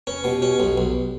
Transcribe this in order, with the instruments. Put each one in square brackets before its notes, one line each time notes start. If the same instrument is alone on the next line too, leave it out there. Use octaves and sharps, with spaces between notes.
[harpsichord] C#4 [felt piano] B4
[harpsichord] B2 [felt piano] G4
[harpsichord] C#4 [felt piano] G4
[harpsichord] B1 [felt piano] G4
[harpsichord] B1